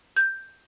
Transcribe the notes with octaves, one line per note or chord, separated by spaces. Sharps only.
G6